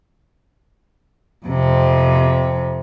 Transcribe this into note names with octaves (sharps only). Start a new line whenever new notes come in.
F2 C3